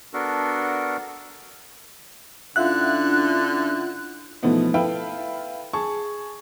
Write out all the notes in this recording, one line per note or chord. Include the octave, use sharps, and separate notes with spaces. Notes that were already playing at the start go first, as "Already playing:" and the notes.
B3 D4 F#4 A4 A#4
D3 C#4 D4 E4 F4 E5 F#5 F#6
B2 E3 F3 A3 B3 D#4
E4 A4 B4 E5 F5 G5
G#4 A5 C#6